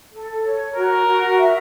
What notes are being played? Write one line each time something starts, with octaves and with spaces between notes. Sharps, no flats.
A4
C#5
F#4 A#4
F#4
E5